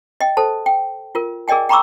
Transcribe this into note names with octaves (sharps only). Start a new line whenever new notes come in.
D#5 G5
A4 C5 A5
G5
F4 A#4
G#4 A#4 D5 D#5 G5 G#5
G5 A#5 B5 C#6 D6 E6